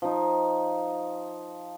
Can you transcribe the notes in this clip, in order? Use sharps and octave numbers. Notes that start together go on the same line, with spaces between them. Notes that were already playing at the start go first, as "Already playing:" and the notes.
F3 D#4